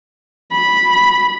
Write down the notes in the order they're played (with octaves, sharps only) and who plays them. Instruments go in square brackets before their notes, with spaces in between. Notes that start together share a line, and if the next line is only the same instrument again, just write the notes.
[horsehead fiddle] B5